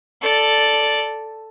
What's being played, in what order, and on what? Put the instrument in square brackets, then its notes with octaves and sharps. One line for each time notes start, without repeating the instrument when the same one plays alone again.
[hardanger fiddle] A4 D5